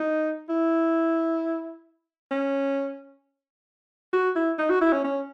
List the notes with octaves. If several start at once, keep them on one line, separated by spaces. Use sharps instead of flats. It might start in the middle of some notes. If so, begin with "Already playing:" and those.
Already playing: D#4
E4
C#4
F#4
E4
D#4
F#4
E4
C#4
C#4